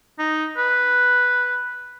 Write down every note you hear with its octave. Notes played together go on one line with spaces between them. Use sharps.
D#4
B4